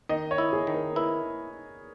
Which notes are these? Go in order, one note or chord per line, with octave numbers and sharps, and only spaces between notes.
D#3 D#5
C#5
E4
G#4
D#3
A#4
E4 B4